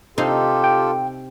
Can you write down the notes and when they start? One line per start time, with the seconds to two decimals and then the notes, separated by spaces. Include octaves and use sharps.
0.18 C3 D#4 F4 G4 A4 C5
0.64 G5